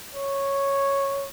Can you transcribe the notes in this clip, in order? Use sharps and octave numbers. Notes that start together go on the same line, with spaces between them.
C#5